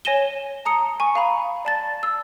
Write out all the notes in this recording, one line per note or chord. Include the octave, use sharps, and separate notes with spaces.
C#5 G#5 A#6 D#7 E7 G7
A5 A#5 D#6 C#7
G#5 C#6
F5 A#5 B5
D5 A5 A6
E6